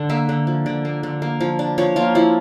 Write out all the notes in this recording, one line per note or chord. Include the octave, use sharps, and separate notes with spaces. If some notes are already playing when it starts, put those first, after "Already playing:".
Already playing: D3
A#3 E5
D3
F3
D3 D5
A#3
D3
A#3
F3
D4
F3 C#5
A#3 F4
F3 E4